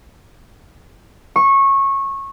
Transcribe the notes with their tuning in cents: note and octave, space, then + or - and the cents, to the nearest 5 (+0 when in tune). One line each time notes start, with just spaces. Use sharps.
C#6 -20